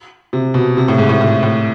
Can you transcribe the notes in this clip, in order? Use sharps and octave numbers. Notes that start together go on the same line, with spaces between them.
C3
B2
C3
A2
G#2
A2
A2
A2